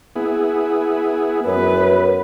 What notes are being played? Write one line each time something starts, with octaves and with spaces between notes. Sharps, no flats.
B3 E4 G#4
F#2 B4